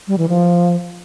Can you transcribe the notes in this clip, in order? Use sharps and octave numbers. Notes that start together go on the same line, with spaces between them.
G3
E3
F3